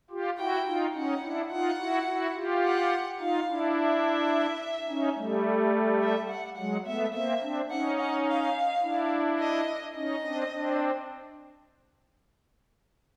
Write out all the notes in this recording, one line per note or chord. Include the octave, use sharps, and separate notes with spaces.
F4 G4
E4 F#4 G5
D#4 F4
C#4 D#4 F#5
D4 E4
D#4 F4 F#5
E4 F#4
E4 F#4
F4 G4
F#5
D#4 F4 F5
D4 E4
E5
C#4 D#4
G3 A3
E5
F#5
F#3 G#3 F#5
A3 B3 E5
A#3 C4 E5
C4 D4
C#4 D#4 F#5
F#5
F5
D4 E4
D#5
C#4 D#4 D#5
C4 D4
C4 D4